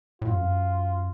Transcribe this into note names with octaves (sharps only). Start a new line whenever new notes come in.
A2 F4
F#2
F2
F#2